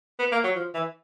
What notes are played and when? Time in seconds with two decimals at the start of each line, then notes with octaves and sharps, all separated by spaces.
0.19 B3
0.32 A#3
0.44 F#3
0.56 F3
0.74 E3